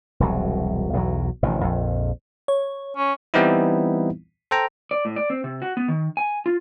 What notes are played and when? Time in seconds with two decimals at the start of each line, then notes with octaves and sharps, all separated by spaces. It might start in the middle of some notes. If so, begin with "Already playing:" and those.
0.20 E1 C2 F#3
0.93 B1 E2 D#3 F#3
1.43 A1 C3 D#3 F3
1.64 A#1 F2
2.48 C#5
2.97 C#4
3.34 E3 G3 B3 C4 D#4 E4
4.51 A4 C5 G5 A#5
4.91 D5
5.05 A2
5.16 D5
5.30 C4
5.44 C3
5.62 F#4
5.77 B3
5.88 D#3
6.17 G#5
6.46 F4